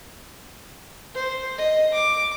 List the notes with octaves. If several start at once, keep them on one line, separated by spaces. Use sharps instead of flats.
C5
D#5
D6